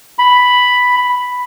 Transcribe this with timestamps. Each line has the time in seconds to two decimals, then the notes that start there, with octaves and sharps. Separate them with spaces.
0.19 B5